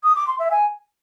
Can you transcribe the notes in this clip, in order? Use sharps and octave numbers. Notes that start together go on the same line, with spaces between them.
D#6
D6
C6
E5
G#5